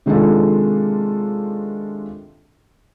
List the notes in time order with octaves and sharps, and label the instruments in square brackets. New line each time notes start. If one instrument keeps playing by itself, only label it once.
[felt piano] C3 D#3 G#3 D4 F4 A4